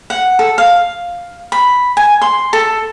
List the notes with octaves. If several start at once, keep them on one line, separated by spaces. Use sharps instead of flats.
F#5
A4
F5
B5
G#5
C6
A4